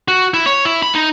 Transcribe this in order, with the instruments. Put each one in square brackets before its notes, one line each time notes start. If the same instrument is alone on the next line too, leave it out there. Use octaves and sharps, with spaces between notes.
[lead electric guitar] F#4
E4
C#5
E4
B5
D#4